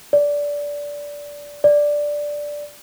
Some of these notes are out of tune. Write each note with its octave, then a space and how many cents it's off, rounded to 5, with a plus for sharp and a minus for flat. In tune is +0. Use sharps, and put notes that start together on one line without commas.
D5 -15
D5 +0